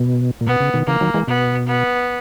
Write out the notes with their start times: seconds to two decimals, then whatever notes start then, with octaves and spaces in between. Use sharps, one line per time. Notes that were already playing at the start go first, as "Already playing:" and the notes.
Already playing: B2
0.41 A#2
0.47 B2 B3
0.60 C#3
0.74 B2 D#3
0.87 C#3 E3 A#3
1.01 D#3 F#3
1.14 E3 G#3
1.27 B2 B3
1.67 B3